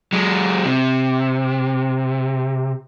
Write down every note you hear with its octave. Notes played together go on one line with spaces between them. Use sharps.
F#3 G#3
C3